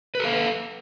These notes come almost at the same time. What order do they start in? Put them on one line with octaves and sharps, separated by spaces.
B4 A4 F5